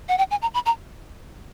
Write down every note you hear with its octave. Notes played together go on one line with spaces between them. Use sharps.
F#5
G5
G#5
A#5
B5
A#5